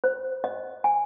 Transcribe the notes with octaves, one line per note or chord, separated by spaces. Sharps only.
C5
D#5
G#5